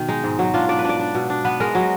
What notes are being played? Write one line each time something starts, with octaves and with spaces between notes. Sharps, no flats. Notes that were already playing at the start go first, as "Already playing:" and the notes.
Already playing: B2 D#3
G#3 D#4
G#2
F#3
D4 F4
D4 D5
B4
D4 D5
D4
B2
D4
B3 B4
G#3 A#4
F#3